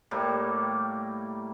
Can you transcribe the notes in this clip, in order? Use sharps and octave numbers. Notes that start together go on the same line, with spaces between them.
A2 G3 A#3 G4